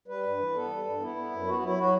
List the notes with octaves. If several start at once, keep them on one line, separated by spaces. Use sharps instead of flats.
G3 B4
G2
E3
B3 A4
G3
G2
B3 E4
B3
F#2
B3 F#4
F#4
F#3 E4
F#3 F#4